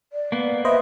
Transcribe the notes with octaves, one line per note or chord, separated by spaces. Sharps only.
D5
A#3 B3
B4 C5 D#5 E5